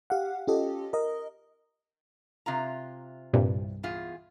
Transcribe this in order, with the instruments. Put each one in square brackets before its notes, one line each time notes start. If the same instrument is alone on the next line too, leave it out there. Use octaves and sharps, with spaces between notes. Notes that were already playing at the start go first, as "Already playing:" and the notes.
[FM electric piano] G4 F5 F#5
C#4 F4 G4 A4 D#5
A#4 D#5
[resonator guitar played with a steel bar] C3 F4 A#5
[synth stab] C2 G2 [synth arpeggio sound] A#2
[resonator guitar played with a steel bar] E2 F4 G#4